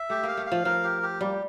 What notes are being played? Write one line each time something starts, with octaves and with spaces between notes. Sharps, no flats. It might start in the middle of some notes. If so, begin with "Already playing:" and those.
Already playing: E5
A3 G4
A#3 F5
A3
F5
F3
F3 A#4
G4
G4
G3 A#3